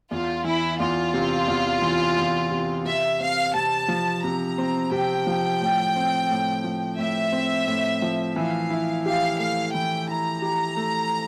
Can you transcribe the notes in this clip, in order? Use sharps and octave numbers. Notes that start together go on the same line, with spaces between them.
E2 F4
E3 E4
E2 F4
C3
E2
E3
E2
C3
C3 E5
C4 F5
C3 A5
F3
C3 A#5
C4
C3 G5
F3
A2
C4
A2
F3
A2 E5
C4
A2
F3
E3 F5
E4
G4 F5
A3 F5
E3 G5
E4 A#5
G4
A3